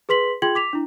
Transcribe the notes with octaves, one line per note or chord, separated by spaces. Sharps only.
G#4 B4 C6 B6 F#7
F4 G#4 G5 C6 G#6 F#7
D6 B6 F7
D4 E4